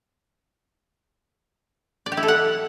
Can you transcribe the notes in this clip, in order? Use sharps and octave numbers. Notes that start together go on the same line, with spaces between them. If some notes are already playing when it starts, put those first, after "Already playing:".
D5
G4
E4
A4
F#5